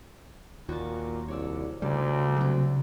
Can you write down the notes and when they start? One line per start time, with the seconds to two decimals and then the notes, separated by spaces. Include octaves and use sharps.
0.69 D#2 A#2 F#4 A6
1.28 C2 C#5 D5 E6
1.82 D2 C#3 G3 D5
2.37 C3 F#3